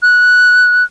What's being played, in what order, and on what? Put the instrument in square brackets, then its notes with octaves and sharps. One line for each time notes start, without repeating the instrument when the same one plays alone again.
[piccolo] F#6